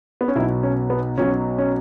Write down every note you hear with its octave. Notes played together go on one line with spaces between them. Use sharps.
B3
C#4
B1 B2 F#3 E4
C#4
B3
B1 B2 F#3 C#4
C#4